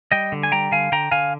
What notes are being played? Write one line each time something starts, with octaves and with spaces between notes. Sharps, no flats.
G3 D#5 G5
D3
G#5
G3 G5 A#5
D3 F5 G#5
D3 G5 A#5
D3 F5 G#5